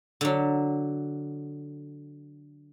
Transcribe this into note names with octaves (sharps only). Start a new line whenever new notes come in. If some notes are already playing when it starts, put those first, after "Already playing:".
D3 F#3